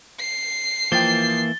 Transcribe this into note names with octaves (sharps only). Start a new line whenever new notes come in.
C7
E3 F3 A#3 G5 A6 G7